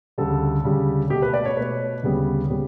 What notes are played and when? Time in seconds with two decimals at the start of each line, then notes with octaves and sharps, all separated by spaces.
0.18 D2 C#3 G3 A4
0.64 D2 C#3 G3
1.10 B2 A3 G4
1.22 B4
1.34 D5
1.45 C#5
1.56 B2 A3 B4
2.03 D2 C#3 G3 B3
2.50 C#3 G3 B3